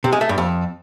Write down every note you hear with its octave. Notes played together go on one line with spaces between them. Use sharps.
C3
G#3
A3
G2
F2